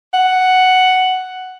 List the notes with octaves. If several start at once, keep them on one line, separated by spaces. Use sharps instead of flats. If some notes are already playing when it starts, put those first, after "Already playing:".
F#5